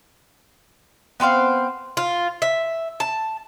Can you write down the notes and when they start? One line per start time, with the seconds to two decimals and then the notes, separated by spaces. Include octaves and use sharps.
1.20 B3 C4 C5 F5
1.97 F4
2.42 E5
3.00 A5